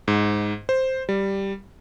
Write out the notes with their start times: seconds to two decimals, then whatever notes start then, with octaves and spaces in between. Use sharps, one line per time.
0.08 G#2
0.69 C5
1.09 G3